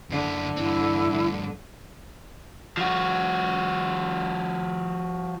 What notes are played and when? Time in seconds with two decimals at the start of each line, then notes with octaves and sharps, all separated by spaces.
0.10 F#2 D3 E4
0.56 G2 C4 E4
1.10 G2 B2
2.77 F3 F#4